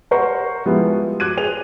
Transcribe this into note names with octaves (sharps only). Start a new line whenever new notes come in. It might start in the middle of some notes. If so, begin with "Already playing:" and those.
G4 A#4 C5 F#5 A#5 C#6
F3 G3 G#3 B3 E4
D6 F#6 G#6 D#7
G#4 C5 F7